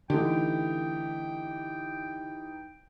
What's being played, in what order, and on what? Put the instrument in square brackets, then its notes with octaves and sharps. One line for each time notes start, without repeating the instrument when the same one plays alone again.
[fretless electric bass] D3 A3 [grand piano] E3 D#4 G4 [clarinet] G5